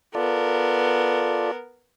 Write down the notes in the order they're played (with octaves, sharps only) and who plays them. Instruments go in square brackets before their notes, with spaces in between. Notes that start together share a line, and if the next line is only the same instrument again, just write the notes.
[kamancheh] B3 A#4 [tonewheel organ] F4 A4 D5